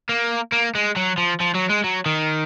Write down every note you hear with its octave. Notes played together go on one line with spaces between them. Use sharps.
A#3
A#3
G#3
F#3
F3
F3
F#3
G#3
F#3
D#3